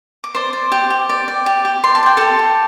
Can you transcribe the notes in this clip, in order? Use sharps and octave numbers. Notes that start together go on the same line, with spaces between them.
D6
C5 D5 C6
D5
G4
G4
D5
D5
G4
G4
D5 C6
A5
D5 G5
G4 A4 A5
G4